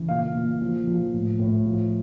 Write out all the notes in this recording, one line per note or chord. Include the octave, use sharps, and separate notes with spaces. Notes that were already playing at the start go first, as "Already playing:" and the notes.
Already playing: C#3 E3
A#2 F5
A#2
F3
F3
A2
A2
F3